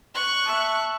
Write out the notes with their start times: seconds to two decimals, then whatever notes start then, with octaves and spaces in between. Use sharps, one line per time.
0.15 C#6 F#6
0.45 E5 A5